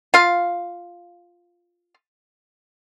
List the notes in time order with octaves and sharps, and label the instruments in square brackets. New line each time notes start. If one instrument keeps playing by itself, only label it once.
[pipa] F4 F5